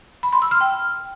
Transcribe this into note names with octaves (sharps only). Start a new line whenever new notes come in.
B5
C6
E6
F6
G5